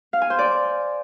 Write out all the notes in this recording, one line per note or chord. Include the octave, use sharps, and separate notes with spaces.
F5
G#5
C5
D5